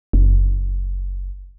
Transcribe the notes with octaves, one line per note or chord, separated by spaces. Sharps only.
F#1